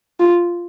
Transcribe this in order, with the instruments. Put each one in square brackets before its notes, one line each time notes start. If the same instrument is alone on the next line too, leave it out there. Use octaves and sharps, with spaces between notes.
[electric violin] F4